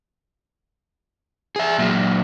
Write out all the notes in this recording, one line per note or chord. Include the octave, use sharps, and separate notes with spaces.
G#4 E5
A#2 F#3